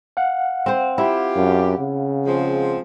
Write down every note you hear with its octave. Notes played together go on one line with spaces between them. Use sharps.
F5 F#5
C4 C5
E4 F4 G4
F#2
C#3
F3 G#3 C4